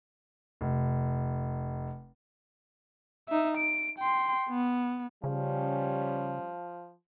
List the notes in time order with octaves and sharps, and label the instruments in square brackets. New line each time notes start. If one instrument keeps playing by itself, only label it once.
[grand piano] F1
[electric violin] D#4 E5
D7
G5 C6
B3
[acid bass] C#3 [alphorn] F3 [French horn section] G3 C#4